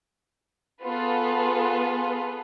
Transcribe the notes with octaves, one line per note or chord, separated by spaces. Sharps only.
B3 F4 G#4 A4 B4